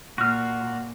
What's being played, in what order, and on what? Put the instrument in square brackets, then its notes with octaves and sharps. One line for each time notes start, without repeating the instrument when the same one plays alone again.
[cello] A#2 [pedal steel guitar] F#4 F6